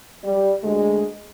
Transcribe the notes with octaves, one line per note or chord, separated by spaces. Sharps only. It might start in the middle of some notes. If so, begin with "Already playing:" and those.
G3
D2 G#3